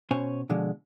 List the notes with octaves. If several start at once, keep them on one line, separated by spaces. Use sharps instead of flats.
B2 C#4 C5 C#5 G#5
B2 D3 F3 G#3